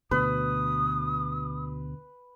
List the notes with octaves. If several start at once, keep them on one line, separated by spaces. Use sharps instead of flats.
D2 B2 B4 D#6